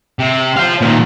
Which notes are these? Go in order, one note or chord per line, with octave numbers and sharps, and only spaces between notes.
C3
C5 F5
A#2 D#3